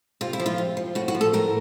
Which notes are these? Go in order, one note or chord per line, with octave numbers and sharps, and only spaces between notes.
C3 F4
E4
F3
F4
C3
F3
A2 F#4
F#4
F3
A4
A2 A#4